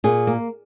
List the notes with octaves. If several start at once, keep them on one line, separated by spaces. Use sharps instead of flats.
A#2 G#4
A#3